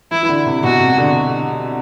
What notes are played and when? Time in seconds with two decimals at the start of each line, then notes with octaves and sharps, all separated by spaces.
0.11 E3 E4
0.23 E3
0.29 D3
0.46 C3
0.63 B2 F#4
0.80 C3
0.98 D3